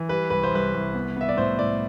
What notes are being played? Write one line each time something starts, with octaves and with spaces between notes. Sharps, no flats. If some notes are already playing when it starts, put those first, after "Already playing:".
Already playing: E3
G3 B4
C2 B4
C5
C2 B4
C2
B3
B3 E5
D5
A2 C5
A2 D5